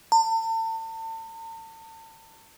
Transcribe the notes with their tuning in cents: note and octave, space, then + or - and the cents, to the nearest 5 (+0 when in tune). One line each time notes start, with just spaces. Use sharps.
A5 +40